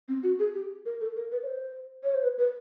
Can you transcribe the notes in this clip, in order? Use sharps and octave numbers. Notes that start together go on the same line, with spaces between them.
C4
F#4
G#4
G4
A#4
A4
A#4
B4
C#5
C5
C#5
C5
B4
B4